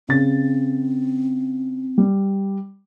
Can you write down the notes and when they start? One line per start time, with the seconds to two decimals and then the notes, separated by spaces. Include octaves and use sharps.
0.09 C#3 C4 A6
1.98 G3